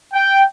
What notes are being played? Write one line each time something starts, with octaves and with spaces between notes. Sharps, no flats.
G5